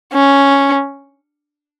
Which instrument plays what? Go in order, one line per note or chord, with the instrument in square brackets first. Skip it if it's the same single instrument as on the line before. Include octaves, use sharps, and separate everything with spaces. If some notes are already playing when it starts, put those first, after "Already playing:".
[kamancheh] C#4